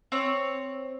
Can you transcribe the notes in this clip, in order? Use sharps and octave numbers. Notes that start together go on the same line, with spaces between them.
C4 C#5